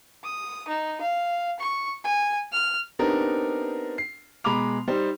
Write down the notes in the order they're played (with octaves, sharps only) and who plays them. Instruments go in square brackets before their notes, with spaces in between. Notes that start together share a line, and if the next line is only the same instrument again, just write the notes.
[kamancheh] D#6
D#4
F5
C#6
G#5
F6
[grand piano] B3 C4 D4 D#4 G4 A#4
C7
B2 G#3 A#5 B5 D6 F7
G3 D#4 C5